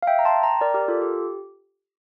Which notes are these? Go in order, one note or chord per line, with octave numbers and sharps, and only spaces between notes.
F5
E5 G5
A#5
A5 C6
G5 A#5
A#4 D5
G4 A#4
F4 A4
G4